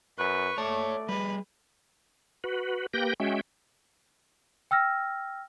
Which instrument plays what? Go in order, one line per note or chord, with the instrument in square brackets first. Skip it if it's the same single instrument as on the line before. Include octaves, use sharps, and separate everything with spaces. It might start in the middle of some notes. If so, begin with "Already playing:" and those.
[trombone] F#2 [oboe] B4 [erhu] C#6
[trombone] A3 [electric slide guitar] C#5 A5 [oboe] D5
[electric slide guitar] G3 G#4 [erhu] B4
[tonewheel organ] F#4 B4
A#3 G4 B4 G5 G6 A#6
G#3 C#4 F#4 E5 G5
[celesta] G5 E6 F6 A#6